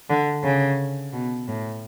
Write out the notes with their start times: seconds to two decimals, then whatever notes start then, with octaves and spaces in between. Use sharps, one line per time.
0.09 D3
0.43 C#3
1.12 B2
1.47 A2